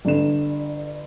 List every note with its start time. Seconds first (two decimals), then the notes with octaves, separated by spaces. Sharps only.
0.05 G1 D3 E7